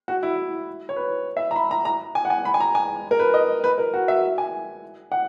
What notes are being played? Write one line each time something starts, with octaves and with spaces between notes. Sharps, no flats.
F#4
E4
C#5
B4
E5
A#5
B5
A#5
A#5
G#5
F#5
G#5
B5
G#5
A#5
G#5
A#4
B4
D#5
B4
A#4
F#4
E5
G#5
F#5